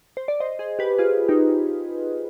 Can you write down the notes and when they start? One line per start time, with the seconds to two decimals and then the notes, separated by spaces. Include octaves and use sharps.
0.17 C5
0.28 D5
0.40 C5 D#5
0.59 G#4 C5
0.79 G4 B4
0.98 F4 G#4
1.29 D#4 G4